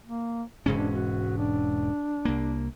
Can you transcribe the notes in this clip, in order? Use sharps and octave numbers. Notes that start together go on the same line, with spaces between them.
A#3
E1 G#2 C#3 C#4
D4
F#4
D4
C2 A#3